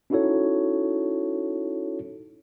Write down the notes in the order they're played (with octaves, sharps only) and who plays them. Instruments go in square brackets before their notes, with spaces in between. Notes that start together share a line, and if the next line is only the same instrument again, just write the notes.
[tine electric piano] C#4 D#4 E4 F#4 A4 C#5